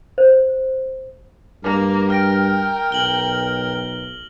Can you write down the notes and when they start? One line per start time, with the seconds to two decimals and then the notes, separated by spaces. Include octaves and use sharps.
0.18 C5
1.64 G2 A#3 A#4
2.10 G5 F6 A#6 D7
2.92 B1 F#7 G7